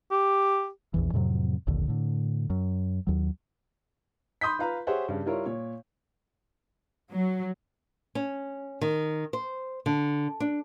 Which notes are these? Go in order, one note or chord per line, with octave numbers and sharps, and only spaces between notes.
G4
A#1 E2 E3
F2 A2 C3 F#3
F1 A#1 D#2 D3
A2 D3
F#2
D#2 F#3
B5 C6 D#6 G6 B6
F4 B4 F5 A#5
G4 G#4 C5 C#5 E5 F#5
G2 C#3
G3 E4 F4 A#4 C#5
A#2 C#5
F#3
C#4
D#3
C5
D3
D4